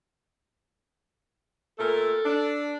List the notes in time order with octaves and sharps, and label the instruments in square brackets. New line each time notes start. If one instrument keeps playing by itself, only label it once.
[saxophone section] A#2 A3 A#4 [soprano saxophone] A4
[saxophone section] D4